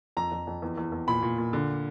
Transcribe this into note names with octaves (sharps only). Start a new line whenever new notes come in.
F2 A#5
F2
F2
E2
E2
E2
A#2 B5
A#2
A#2
D3